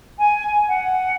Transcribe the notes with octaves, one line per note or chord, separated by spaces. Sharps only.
G#5
F#5